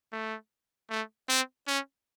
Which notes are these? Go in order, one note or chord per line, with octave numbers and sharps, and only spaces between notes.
A3
A3
C4
C#4